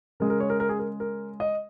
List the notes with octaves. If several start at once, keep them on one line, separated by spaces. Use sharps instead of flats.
C#3 G#3 A#4
A#4
C#5
A#4
A#4
G#4
A#4
A#4
D#5